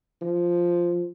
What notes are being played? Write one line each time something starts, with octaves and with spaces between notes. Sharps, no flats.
F3